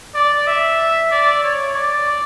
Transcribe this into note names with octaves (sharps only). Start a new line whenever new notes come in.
D5
E5
D5
C#5
D5